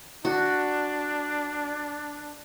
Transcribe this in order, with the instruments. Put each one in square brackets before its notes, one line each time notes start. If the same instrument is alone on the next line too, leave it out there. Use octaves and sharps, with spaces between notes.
[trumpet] D4 [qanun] F#4